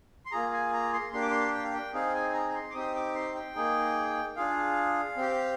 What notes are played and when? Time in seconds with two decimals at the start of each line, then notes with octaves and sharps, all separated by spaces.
0.26 C6
0.32 A#3 F4 G#4 A#5
0.53 G#5
0.73 A#5
0.93 C6
1.12 A#3 D4 G4 C6
1.22 D6
1.31 C6
1.54 G5
1.64 F5
1.73 G5
1.93 C4 D#4 G#4 F5
2.15 G#5
2.34 A#5
2.51 A#5
2.55 C6
2.71 D6
2.74 C4 D#4 G4 D#6
2.95 D6
3.15 C6
3.35 G5
3.56 A#3 D#4 G#4
4.36 D4 F4 G#4 F5
5.17 C4 G4